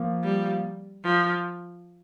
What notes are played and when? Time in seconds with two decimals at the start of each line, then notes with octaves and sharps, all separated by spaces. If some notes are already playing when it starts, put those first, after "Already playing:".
Already playing: F3 A#3
0.23 G3
1.04 F3